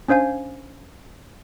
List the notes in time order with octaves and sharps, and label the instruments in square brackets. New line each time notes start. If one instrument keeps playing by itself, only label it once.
[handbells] C#4 D4 C5 F5 G#5